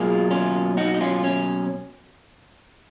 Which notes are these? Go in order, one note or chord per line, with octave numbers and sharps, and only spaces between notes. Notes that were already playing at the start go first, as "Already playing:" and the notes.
Already playing: B2 F#3 A#3 F4 G#4
C#4 F4
D#4 F#4
D#4
C#4 F4
C#4